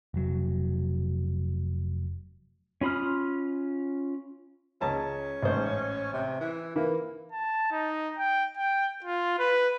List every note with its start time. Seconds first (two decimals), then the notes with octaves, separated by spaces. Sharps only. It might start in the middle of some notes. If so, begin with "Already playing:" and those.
0.14 F1 F#3
2.81 C#4 F4 B5 D#6 F6
4.81 C#2 C#4 A5 A#5
5.43 A1 G#2 C5
6.13 C3
6.40 E3
6.76 E3 A#3 E4
7.32 A5
7.71 D#4
8.18 G5
8.57 G5
9.04 F4
9.39 B4